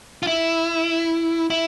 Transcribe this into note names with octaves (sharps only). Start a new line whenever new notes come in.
F4
E4
E4